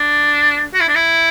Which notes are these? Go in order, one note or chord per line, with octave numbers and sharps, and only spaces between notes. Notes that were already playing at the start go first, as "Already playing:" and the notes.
Already playing: D4
F#4
E4
D4
E4